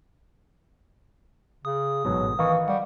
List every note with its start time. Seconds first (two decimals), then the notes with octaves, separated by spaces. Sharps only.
1.65 C#3 D#6
2.05 A1 G#2 B2 F#3
2.39 D#3 E3 D#4 F5 C#6
2.68 G3 F#5